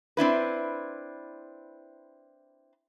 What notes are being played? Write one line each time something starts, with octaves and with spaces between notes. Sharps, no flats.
C4 D4 E4 B4